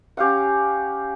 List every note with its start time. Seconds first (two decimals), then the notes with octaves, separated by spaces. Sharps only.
0.17 C#4 G4 F5 F#5